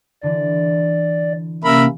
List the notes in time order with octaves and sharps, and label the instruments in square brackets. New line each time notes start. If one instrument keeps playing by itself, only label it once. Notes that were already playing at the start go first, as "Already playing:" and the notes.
[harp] D3 E3 [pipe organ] D5
[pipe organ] C3 A#3 C#4 [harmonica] A#4 E5 B5